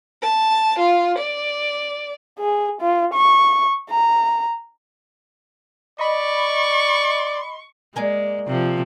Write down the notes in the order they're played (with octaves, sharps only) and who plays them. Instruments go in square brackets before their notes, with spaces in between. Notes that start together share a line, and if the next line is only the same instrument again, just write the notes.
[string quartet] A5
F4
D5
[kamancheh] G#4
F4
C#6
A#5
[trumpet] D5 [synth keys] D#5 B5 [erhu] C#6
[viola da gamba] G#3 [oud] A#3 G#4 D5
[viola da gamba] C3 F3